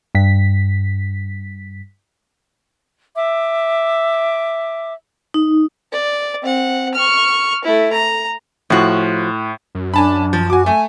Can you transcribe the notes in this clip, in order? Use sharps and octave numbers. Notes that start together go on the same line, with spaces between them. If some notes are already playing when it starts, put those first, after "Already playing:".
G2 B6
E5 D6
D#4
D5
C4 F#5
C#6 F6
A3 E4
A#5
A2 F3 F#4
F#2
D4 G#5 A5 B5
F3
F#4 G#5 D6
A3 G#5